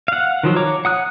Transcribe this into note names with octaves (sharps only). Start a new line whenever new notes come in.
F5 F#5
D#3 F3 F#3
C#5 A#5 D6
F#5 D#6 F#6